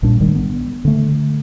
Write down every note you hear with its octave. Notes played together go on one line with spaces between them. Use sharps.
A#1 A#2 G3 D4
G#2 D#3 G3 G#3
B3
D3 A3